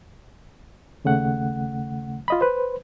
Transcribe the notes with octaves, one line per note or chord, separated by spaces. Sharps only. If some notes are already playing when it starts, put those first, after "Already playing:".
D#2 C#3 A3 F#5
F4 D#5 B5
B4 C5